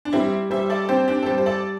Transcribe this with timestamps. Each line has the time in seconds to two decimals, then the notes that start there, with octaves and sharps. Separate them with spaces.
0.05 D4
0.13 G3 C4 E4
0.50 G3 C5 E5
0.70 A4 D5
0.85 A4
0.89 C4 G4 C5
1.08 D4 G4
1.23 A4
1.26 G3 G4 C5
1.38 C5
1.46 A4 D5